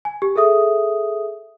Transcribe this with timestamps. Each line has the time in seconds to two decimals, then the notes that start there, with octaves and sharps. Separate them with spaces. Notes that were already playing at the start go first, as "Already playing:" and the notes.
0.05 G#5
0.22 G4
0.36 G#4 A4 E5 D#6